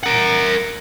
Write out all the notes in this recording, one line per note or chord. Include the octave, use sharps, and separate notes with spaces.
A#4 F#5